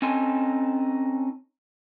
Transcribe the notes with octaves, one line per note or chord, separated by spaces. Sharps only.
C4 C#4 D#4 A4 G#5 C6